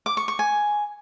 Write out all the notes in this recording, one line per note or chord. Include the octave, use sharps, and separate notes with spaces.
D6
C#6
C#6
G#5